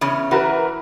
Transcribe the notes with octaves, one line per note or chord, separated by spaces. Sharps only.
E2 C#3 C#4
E3 F#4 A#4 B4